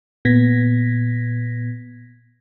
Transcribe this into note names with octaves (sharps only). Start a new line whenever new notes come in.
A#2 B3 G#6 A#6 B6